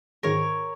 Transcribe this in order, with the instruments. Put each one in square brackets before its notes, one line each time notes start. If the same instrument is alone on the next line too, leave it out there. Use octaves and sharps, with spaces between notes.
[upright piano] G#2 D#3 G#3 [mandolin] A#4 C#5